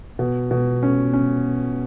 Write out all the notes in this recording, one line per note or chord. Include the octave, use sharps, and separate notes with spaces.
B2
B2
C#4
C#4